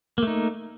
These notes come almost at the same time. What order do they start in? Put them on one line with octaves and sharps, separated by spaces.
A#3 A3 D#4